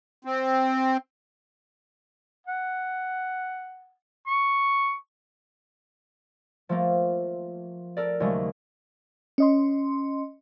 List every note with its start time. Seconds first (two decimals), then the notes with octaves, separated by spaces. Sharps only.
0.25 C4
2.47 F#5
4.27 C#6
6.69 F3 A3 A#3
7.97 A4 A#4 D5
8.20 D#2 C#3 F#3 G#3 A3
9.38 C#4 D#5 C6